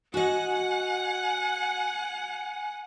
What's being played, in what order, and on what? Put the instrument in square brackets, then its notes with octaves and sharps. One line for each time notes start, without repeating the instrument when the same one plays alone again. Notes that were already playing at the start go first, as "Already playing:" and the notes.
[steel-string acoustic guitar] F#4 D#5 [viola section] F#5 [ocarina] G#5